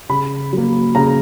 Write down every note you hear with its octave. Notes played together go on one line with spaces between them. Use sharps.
C#3 B5
F#3 A#3
C#3 A#5